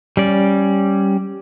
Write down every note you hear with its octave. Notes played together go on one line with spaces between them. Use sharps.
G3 C#4 D5